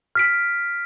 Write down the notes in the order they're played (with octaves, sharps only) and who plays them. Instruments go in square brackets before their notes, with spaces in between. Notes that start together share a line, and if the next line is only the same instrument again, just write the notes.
[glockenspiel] F6 B6 D7